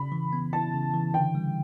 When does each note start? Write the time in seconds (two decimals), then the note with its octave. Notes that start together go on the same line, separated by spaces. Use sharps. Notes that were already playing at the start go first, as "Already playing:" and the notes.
Already playing: C#3 B5
0.12 E3
0.33 B3
0.53 E4 A5
0.74 C#3
0.94 E3
1.14 D3 G5
1.35 G3